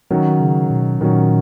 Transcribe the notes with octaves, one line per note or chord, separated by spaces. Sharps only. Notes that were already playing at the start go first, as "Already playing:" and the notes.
D#3 F#3 C#4
C#3
B2
A#2 D#3 F#3 C#4